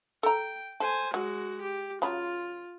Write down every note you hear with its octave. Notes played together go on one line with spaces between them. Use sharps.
A4 G5 A#5
A4 C5 G#5
F#3 G#3 F#4
G4
C#3 F#3 F4 B5